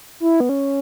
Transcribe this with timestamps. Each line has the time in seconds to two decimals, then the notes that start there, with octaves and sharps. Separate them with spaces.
0.20 E4
0.40 B3
0.49 C#4